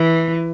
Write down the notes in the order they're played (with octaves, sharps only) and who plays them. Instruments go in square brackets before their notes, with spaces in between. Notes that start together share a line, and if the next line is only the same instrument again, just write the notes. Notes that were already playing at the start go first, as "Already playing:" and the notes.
Already playing: [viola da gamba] E3